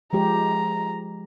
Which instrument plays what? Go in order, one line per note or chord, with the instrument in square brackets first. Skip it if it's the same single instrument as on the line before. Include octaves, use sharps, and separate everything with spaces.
[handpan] F3 G#3 G4 [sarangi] A#5